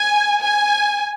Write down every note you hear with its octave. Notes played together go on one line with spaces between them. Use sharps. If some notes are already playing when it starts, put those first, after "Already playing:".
Already playing: G#5
G#5